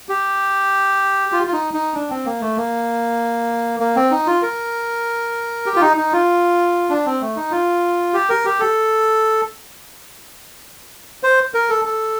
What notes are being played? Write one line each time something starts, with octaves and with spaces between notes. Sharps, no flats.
G4
F4
F4
D#4
D#4
D4
C4
A#3
A3
A#3
A#3
C4
D#4
F4
A#4
G4
F4
D#4
D#4
F4
D4
C4
A3
D#4
F4
G4
A#4
G4
A4
C5
A#4
A4
A4